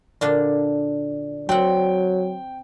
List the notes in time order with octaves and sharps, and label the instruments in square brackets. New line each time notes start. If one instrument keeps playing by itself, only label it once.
[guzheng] A#2 D3 D4 [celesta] D5
[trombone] F#3 [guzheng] C4 F#5 [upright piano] G5